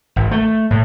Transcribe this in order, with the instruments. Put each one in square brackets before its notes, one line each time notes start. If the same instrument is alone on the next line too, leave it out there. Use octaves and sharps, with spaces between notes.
[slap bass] G#1
A3
A2